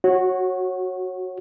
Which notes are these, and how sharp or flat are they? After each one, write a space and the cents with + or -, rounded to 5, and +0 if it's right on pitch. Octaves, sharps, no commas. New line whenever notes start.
F#4 +0 C#5 -20